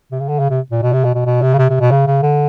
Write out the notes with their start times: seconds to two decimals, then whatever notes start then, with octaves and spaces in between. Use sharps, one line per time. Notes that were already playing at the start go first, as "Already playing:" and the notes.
0.12 C3
0.20 C#3
0.29 D3
0.39 C#3
0.50 C3
0.72 A#2
0.82 B2
0.93 C3
1.04 B2
1.15 B2
1.26 B2
1.42 C3
1.54 C#3
1.58 C3
1.70 C3
1.80 B2
1.91 C#3
2.07 C#3
2.23 D3